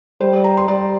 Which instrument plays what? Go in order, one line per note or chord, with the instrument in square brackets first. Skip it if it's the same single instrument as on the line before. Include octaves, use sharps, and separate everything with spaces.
[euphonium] G3 [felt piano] C5
[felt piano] D5
A#5
C6
[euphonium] G3 [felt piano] D5